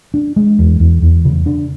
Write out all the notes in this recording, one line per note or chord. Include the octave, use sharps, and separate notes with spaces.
D4
G#3
E2
E2
E2
C#3
D4